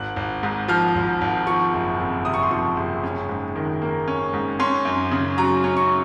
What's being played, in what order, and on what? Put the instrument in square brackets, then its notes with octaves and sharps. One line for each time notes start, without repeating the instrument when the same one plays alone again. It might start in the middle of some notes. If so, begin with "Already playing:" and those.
Already playing: [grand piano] G#1 F#6
G#1
G#2
F3 F6
G#1
G#1
F3 C#6
F#1
F2
C3 D#6
C#6
C6
F3 C#6
F#1
C#4
G#2
D#3
A#3
C#4
G#2
C#4 C6
F#2
C#3
F#3 A#5
C#4
C#6